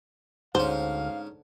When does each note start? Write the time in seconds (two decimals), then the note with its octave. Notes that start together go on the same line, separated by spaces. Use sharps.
0.55 D2 G#2 C#4 C5 F5